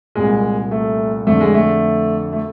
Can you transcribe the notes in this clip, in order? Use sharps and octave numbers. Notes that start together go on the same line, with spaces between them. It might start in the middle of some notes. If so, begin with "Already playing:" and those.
C2 A#2 G#3
A3
F2 D3 A3
G#3
A3
A3